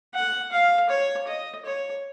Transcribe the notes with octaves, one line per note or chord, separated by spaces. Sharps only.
F#5
F5
C#5
D#5
C#5